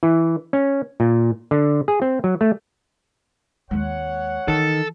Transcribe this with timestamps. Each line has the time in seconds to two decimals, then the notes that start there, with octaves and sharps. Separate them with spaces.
0.03 E3
0.53 C#4
1.00 A#2
1.51 D3
1.88 G#4
2.02 C4
2.24 F#3
2.41 A3
3.71 D#2 G#3 C#5 F#5
4.48 D#3 E3 A4